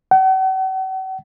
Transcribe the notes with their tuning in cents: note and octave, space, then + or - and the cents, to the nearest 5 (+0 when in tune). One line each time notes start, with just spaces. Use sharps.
F#5 +45